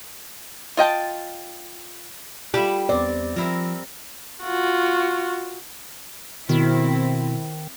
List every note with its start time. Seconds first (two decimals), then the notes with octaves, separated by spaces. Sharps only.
0.77 F4 D#5 G5 A5
2.54 G3 E4 F4 G4 D5 E5
2.89 E2 B3 C4 D5
3.36 F3 C4 E4 A#4
4.43 F4 F#4
6.49 B2 D#3 C4 E4